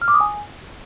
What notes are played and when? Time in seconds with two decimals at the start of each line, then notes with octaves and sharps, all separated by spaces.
0.02 F6
0.08 D6
0.14 D#6
0.20 G#5